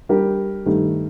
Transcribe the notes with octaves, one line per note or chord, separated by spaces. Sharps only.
G3 D4 G4 A#4
G2 D#3 A3